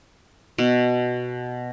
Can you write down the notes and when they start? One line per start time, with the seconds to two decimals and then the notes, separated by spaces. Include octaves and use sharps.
0.58 B2